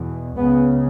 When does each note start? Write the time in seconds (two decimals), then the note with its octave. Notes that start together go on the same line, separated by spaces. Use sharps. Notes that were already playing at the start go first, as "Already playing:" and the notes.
Already playing: E2 B2
0.36 C#2 C#3 B3